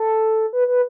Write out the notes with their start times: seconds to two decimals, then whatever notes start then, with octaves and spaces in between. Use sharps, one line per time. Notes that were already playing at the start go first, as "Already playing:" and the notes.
Already playing: A4
0.53 B4
0.68 B4